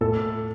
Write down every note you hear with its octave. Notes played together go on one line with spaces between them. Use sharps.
A2 A4